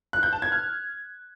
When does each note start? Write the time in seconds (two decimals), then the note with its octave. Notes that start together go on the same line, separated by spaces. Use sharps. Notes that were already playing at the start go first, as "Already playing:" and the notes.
0.13 F#6
0.23 G6
0.33 A5
0.42 G#6
0.52 F6